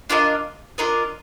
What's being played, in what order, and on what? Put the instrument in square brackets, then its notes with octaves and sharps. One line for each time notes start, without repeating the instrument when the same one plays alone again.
[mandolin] D4 F4 A#4 D#5
D4 F4 A#4 D#5